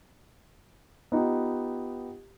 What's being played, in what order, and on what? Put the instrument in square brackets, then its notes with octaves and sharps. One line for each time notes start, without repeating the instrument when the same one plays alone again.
[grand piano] B3 D#4 F4 G4